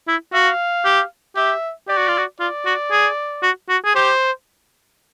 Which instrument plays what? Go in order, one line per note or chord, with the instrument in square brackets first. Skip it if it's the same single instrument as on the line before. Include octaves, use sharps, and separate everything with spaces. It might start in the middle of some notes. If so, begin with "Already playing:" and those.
[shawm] E4
[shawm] F#4 [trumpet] F5
[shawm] G4
[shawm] G4 [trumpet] E5
[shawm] G4 [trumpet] D5
[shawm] F#4
F4
F#4
[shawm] F4 [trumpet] D5
[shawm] F#4
G#4
F#4
F#4
G#4
[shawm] G4 [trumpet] C5